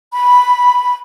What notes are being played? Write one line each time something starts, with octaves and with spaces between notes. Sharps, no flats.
B5